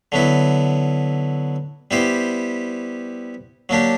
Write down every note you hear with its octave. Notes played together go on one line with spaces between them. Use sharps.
D3 F#3 B3 E4
G3 B3 E4 G4 C5
F#3 A#3 D4 G4